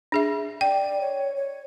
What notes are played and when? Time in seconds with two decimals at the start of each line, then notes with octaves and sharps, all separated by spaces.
0.12 D4 G#4 E5
0.61 D5 G5
1.01 C#5
1.36 C#5